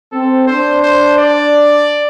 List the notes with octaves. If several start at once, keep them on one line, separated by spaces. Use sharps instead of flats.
C4 A4
D4 C5
C5
D5